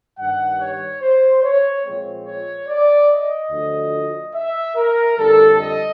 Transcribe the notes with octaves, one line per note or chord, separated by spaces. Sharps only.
G2 D#3 G3 F#5
C#5
C5
C#5
A#2 F3 G#3 C4
C#5
D5
D#5
D2 D3 F3
E5
A#4
F2 D3 G3 A4
D#5